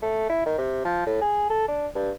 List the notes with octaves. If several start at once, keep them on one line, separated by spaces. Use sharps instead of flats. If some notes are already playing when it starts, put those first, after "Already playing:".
A3
E4
D#3
C3
F3
A2
G#4
A4
D4
G2